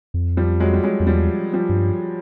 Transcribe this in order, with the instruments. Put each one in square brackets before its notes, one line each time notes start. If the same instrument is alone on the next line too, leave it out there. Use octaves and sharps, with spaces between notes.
[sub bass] F2
[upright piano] F3 G3
F#3 G#3
G3
F#3 G#3
[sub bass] F2
[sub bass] E2 [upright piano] F3 G3
[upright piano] F3 G3
[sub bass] G2